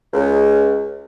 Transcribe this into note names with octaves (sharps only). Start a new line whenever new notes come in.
C#2